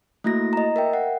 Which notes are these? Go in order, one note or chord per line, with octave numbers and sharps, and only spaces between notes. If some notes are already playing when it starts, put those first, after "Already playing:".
A3 A#3 E4 F#4 A#6
D#5 A#5
A#4 E5 G5
F#5